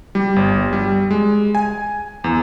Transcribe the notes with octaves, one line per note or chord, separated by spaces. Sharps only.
G3
G1
G3
G#3
G#5
E2